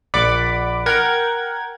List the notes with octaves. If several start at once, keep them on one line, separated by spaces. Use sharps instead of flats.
A#1 D5 F#5 B5 D6
A#4 F#5 G5 G#6